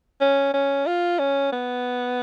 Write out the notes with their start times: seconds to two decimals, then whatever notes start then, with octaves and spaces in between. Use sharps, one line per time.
0.21 C#4
0.54 C#4
0.87 F4
1.19 C#4
1.52 B3